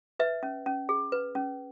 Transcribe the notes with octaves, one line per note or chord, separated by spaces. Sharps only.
B4 E5
C#4
C#4
G#4
B4
C#4